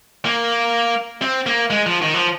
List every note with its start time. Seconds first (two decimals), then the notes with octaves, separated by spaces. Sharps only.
0.25 A#3
1.22 C4
1.46 A#3
1.70 G#3
1.86 F3
2.02 D#3
2.14 F3